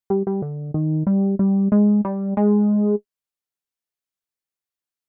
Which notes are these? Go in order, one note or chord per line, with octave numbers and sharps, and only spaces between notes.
G3
G3
D3
D#3
G3
G3
G#3
G3
G#3